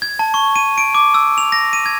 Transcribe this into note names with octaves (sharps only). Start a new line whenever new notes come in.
G#6
A5
C#6
D#7
D7
D6
E6
F7
A#6
D#7
G#6